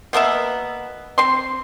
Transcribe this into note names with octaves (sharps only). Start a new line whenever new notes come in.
B2 A#3 B3 E5
C4 C6